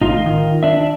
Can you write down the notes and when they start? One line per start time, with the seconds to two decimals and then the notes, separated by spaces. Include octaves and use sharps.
0.01 A1 D#4 F4
0.26 D#3
0.63 D4 E5